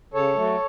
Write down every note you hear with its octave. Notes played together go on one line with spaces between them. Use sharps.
C#3 A4 C#5
F#3 A3